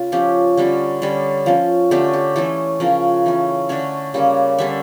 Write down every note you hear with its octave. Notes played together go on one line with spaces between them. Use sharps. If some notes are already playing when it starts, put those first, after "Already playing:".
Already playing: C#3 F4
F3 C#4 G4
D3 G3 C#4
D3 G3 C#4
F3 C#4
D3 A3 C#4 G4
G4
E3 A3 C#4 A4
C#3 F3 C#4 A#4
E3 A3 C#4
D3 A3 C#4 C#5
C#3 G3 A#3 C#4
D3 G3 C#4 E5